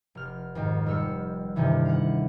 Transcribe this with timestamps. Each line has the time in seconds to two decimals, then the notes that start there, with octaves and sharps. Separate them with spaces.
0.15 F1 F6
0.55 F2 G#2 D#3
0.86 F1 G3 E6 F6 C#7
1.56 D2 G2 C3 D#3 E3
1.85 F5 F#5